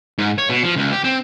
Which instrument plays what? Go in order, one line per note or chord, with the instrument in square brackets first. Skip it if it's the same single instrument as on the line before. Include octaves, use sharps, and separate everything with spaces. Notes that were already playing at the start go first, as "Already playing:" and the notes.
[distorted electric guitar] G#2
C#5
B2
F3
C#2
G4
C4